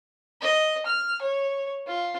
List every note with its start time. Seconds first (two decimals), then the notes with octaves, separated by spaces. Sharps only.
0.41 D#5
0.86 F6
1.22 C#5
1.87 F4